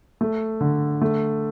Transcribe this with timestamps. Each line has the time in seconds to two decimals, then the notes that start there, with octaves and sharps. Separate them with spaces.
0.21 A3
0.60 D3
1.01 A3